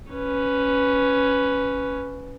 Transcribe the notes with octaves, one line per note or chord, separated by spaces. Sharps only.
C#4 B4